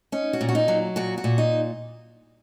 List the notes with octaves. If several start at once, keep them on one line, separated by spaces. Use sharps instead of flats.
C#4 D#4
F#4
A#2
F#4
D#4
F#3
A#2 F#4
F#4
A#2
D#4